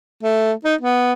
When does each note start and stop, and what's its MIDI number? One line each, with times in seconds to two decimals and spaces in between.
0.23 0.52 57
0.65 0.75 63
0.81 1.13 59